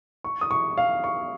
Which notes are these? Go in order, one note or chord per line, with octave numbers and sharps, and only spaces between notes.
C#6
D#6
C#6
F5
C#6